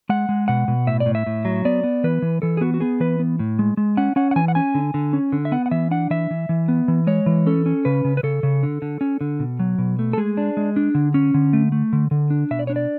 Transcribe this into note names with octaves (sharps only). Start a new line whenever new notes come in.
G#3 F#5
G#3
B2 F#5
B2
A2 E5
D5
A2
E5
A2
F#3
B3 D5
B3
E3 B4
E3
E3 A4
G#4
B3 F#4
F#4
B3 G#4
E3 B4
B3
A2
G#3
G#3
C#4 F#5
C#4 F#5
F#5
E3 G#5
F#5
C#4 G#5
D3
D3
C#4
D3
E5
B3 F#5
F#5
E3 E5
D4 F#5
E3 E5
E3
E3
B3
E3
G#3 C#5
E3
C#4 A4
C#4
C#3 B4
C#3
B4
C#3 A4
C#3
D3
D3
C#4
D3
B2
F#3
B2
A3
A4
G#3 G#4
D4
G#3
D4
D3
C#4
D3
A3
A3
D3
D3
D4
B2 E5
D5
D4 C#5
D5